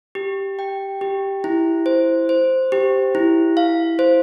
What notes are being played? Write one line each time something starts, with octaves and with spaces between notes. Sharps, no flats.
G4
G5
G4
E4
C5
C5
G4
E4
F5
C5